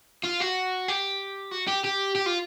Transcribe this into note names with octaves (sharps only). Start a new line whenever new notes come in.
F4
F#4
G4
F#4
G4
G4
G4
F4